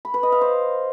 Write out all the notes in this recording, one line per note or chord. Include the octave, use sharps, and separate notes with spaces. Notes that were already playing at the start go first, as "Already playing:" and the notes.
B5
B4
D#5
F5
C5